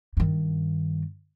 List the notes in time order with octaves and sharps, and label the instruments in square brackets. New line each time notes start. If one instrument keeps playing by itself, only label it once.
[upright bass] G2 D#3